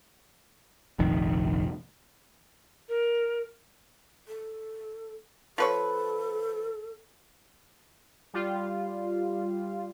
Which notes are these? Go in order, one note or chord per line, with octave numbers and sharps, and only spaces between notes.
F1 A#1 D#3
A#4
A4
F3 A4 B4 C#5
G3 F4